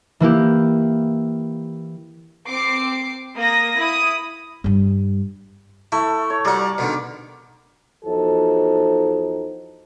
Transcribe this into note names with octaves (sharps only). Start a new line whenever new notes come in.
E3 A#3 E4 G4
C4 D6 C7
A#3 D#6 A#6
E4 D#6
G2 G3
A3 E4
C#5
G3 F#4 A#4 D5
B2 D3 D#3
E2 F3 D#4 F#4 A4 C5